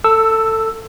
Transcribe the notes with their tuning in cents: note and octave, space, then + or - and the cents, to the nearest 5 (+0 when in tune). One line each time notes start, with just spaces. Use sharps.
A4 +20 E6 +0